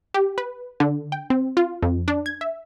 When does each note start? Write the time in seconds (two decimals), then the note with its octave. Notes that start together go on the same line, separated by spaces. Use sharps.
0.14 G4
0.38 B4
0.80 D3
1.12 G5
1.30 C4
1.57 F4
1.83 F2
2.08 D4
2.26 G#6
2.41 E5